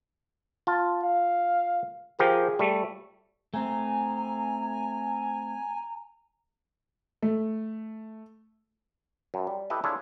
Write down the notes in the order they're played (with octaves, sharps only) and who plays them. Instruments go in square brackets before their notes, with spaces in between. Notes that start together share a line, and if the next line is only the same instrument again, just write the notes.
[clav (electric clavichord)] F4 A5
[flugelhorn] F5
[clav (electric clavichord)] F3 G4 A#4 [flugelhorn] G#4
[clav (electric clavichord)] G3 A3
[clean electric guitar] A3 C4 [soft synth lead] G#5 [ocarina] A#5
[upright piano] A3
[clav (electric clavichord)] F#2
G3
E4 G4 A4 B4 D#5 E5
D4 E4 F4 G#4 A4 C#5